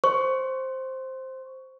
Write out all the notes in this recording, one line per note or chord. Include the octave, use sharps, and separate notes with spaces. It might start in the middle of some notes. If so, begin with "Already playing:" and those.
C5 C#6